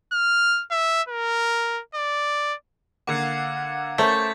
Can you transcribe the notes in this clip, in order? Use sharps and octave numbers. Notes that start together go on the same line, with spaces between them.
F6
E5
A#4
D5
D3 A#3 F5 F#5 D6 G#6 C#7
A3 C#4 A#4 C5 E5 G6 A6 B6